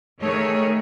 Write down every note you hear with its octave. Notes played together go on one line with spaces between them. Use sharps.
D#3 A3 G#4 A#4 C#5